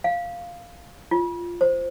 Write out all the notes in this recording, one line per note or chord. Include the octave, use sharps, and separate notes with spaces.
F5
F4
C5